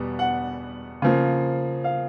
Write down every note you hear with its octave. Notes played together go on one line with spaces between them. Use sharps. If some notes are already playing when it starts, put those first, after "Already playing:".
Already playing: E2 B2 G3 B3
F#5
C#3 F3 A#3
F5